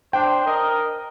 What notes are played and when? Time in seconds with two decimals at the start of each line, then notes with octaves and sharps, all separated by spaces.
0.13 D4 C5 G5
0.45 A#4 D#5